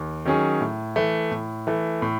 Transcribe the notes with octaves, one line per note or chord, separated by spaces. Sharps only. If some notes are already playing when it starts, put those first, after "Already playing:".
Already playing: D#2
D#3 F#3 C#4 G#4
A2
E3 A3
A2
E3 A3
A2